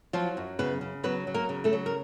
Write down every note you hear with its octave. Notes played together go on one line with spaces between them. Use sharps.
F3 F#3 F4
F#2
C#3 B3 B4
C#3
F#3 B3 B4
F#3
A#3 A#4
C#3
A3 A4
F#3
A#4